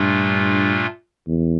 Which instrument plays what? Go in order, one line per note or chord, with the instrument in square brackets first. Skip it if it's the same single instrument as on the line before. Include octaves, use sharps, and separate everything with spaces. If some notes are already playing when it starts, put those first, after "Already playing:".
Already playing: [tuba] G2 [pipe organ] A#2 A3 D4 F4
[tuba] E2